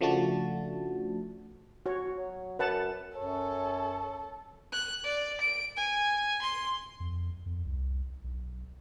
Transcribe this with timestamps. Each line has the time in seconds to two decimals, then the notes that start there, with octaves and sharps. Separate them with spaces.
0.01 C#3 F3 A3 D4 F#4 A5
1.86 F#4 C#5
2.18 F#3
2.59 F#2 B4 F#5 A5
3.17 F#2 A4 C#5
4.72 F#6
5.04 D5
5.40 D7
5.77 G#5
6.41 C6
7.00 F2
7.46 F2
7.65 C2
8.24 B1